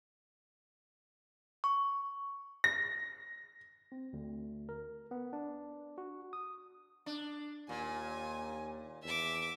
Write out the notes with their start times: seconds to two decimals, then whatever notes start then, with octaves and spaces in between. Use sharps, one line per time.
1.64 C#6
2.64 A#6
3.92 C4
4.13 D2
4.69 A#4
5.11 B3
5.33 D4
5.98 F#4
6.33 D#6
7.06 D4
7.69 D#2 A#2 G#5
9.04 E2 E5 D6